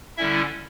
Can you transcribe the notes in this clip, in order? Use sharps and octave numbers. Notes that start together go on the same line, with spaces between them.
D3 G3 C#4 E4 E5